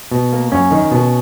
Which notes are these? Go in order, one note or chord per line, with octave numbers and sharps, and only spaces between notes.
B2
A#3
F#2 C#4 C#5
D#3
B2